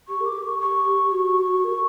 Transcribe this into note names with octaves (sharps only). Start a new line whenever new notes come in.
G4 C#6
A#4 D6
G4
C#6
C#6
F#4
A#4